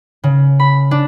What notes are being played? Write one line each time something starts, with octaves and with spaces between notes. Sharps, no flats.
C#3
B5
D4